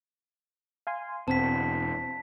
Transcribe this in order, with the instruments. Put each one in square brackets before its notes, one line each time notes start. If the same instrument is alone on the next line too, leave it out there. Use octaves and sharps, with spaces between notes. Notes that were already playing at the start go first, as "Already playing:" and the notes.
[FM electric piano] F5 G#5 C6
[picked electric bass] E1 [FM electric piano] C4 [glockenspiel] A5 B6